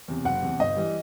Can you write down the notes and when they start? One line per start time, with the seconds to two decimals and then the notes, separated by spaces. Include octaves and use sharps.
0.08 E2 C3
0.25 F#1 F#5
0.42 E2 C3
0.59 G1 D#5
0.77 E3 G3